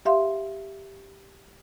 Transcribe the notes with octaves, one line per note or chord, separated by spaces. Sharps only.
G4 E5 F5 C6